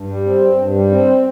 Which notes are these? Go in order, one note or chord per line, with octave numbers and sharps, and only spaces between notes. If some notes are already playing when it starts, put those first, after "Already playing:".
Already playing: G2
G3
C4
G2
G2
G3
C4